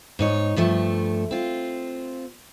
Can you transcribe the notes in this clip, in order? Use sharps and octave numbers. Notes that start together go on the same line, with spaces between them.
G#2 D#4 C#5
G2 F3 A3
C4 F4